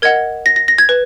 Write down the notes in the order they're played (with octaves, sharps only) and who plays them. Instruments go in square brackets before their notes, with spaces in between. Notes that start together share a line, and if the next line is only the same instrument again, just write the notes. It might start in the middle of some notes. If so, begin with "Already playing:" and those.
[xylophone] A#4 D#5 F#5 G#6
A#6
A#6
A#6
G#6
B4